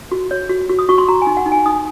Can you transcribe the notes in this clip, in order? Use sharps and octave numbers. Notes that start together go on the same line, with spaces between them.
F#4
C#5
F#4
F#4
D#6
F#4 C#6
C6
F#4 A#5
G#5
D#4
F#5
D#4
G#5
D#4 D#6